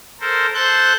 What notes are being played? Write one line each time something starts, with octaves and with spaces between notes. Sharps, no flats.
A4 A#4 C5
A4 C5 A5 F#6 G6